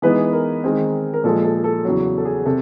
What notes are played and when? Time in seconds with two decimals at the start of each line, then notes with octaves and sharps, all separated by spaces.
0.02 E3 G#3 B3 D#4 B4
0.33 A#4
0.64 D#3 G#3 C4
1.14 A#4
1.24 A#2 F3 G#3 A4
1.44 A4
1.64 A4
1.85 E2 C#3 F#3 F#4
2.18 A4
2.25 G#4
2.46 C3 A4